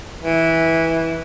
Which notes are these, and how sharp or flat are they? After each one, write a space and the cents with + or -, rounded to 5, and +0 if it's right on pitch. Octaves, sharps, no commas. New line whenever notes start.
E3 -10